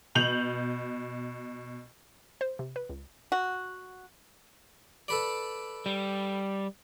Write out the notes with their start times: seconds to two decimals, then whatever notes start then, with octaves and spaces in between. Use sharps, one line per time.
0.15 B2 G6 F7 F#7
2.41 C5
2.59 C3
2.76 B4
2.90 C#2
3.32 F#4
5.08 A4 B4 D5
5.86 G3